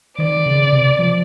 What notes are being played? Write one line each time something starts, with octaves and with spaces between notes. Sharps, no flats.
D#3 D5
C#3
C3
F3